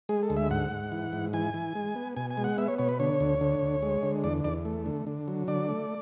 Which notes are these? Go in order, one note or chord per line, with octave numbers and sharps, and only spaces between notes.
G#3 G#4
A4
D2
E5
G#2 F#5
G#2
E3
G#2
E3 G#5
E3
G#3
B3
B2 G#5
G#5
G#3
F#5
B3 E5
C#5
B2 C#5
B4
D3 C#5
D2
D3
D2
G#3
D3
E2 D5
E2 D5
A3
D3
D3
F#3
D3 D5
A3